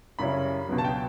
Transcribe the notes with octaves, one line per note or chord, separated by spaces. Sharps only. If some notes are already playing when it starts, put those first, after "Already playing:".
F#2 C#3 G3 C#4 E4 B5
C#2 B2 F#3 B3
A5
G5